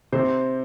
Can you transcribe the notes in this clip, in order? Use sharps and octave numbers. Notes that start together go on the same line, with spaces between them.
C3 C5